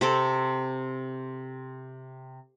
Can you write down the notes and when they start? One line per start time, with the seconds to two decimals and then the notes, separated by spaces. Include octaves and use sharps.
0.01 C3 C4 A4